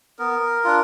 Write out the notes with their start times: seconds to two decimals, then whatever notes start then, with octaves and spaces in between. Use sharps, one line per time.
0.19 B3 A#4
0.64 D4 F4